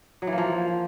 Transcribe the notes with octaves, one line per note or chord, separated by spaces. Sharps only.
F#3
E3
A#3
F3